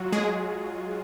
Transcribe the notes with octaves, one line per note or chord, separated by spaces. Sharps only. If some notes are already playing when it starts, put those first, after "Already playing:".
Already playing: F#3 F4 F#4
G#3 G#4